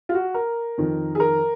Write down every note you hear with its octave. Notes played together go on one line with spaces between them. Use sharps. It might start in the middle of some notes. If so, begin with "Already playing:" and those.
F4
F#4
A#4
F2 D#3
G#4
A#4